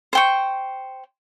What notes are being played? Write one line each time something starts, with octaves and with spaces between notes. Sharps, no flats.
C5 G5 C#6